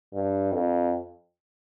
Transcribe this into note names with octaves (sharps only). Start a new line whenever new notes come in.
G2
F2